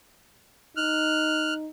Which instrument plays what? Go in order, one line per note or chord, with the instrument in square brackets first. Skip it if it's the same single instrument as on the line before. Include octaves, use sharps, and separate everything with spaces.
[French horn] D#4 [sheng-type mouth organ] F6 F#6